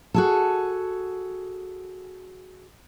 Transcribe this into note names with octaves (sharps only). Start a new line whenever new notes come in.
F#4 G#4 A4